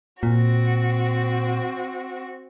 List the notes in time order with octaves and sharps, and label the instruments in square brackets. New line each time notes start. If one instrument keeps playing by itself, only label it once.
[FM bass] A#2 [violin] C4 F#4